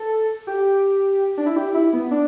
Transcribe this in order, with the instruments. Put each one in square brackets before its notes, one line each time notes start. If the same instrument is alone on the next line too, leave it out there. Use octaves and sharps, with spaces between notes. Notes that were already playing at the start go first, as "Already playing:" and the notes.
Already playing: [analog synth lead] A4
G4
D4
E4
G4
E4
B3
D4